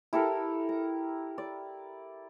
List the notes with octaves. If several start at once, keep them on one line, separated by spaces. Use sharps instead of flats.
E4 G4 A4 A#4
A#5
D5